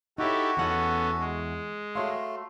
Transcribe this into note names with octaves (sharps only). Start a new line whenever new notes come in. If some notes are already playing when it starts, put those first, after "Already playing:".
D#4 E4 F#4 G4 A4 C#5
E2 B3 C#4 A4 F#5
G#3
A3 F#4 C#5 F5 C6